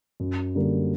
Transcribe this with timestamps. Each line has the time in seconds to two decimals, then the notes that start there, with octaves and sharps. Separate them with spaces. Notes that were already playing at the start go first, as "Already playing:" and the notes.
0.20 F#2
0.55 D3 G3 A#3